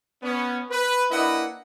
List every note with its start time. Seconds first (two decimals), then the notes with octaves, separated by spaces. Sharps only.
0.23 B3 C#4
0.71 B4
1.11 A#3 D4 E4 B4 D#5 F#5